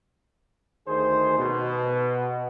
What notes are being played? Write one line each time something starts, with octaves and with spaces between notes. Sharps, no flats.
D2 D#3 G#4 C5
B2